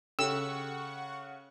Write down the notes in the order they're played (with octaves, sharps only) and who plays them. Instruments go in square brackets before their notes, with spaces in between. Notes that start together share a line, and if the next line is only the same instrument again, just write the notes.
[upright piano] C#3 [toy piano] G4 A4 G5 [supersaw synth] F#5 C#6 [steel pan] E6